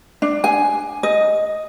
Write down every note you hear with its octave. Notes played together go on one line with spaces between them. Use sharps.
D4
G#5
D#5